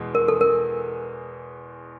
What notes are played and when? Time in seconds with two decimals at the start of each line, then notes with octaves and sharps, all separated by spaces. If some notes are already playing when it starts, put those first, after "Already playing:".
Already playing: E2 B2 G#3
0.15 A#4
0.28 A4
0.41 A#4